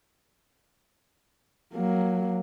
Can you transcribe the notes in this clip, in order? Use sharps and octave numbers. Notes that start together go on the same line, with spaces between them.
F#3 A#3